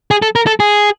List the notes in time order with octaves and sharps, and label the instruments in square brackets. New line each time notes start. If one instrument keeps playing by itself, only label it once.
[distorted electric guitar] G#4
A4
A#4
A4
G#4